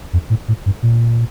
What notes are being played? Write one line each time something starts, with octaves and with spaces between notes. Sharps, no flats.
F2
A2
A2
G2
A#2